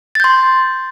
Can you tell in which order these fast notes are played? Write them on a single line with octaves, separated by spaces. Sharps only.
A6 G6 C6